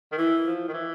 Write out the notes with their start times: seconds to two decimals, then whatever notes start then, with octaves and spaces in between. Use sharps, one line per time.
0.12 D#3
0.18 E3 E4
0.46 F3
0.68 D#3
0.73 E3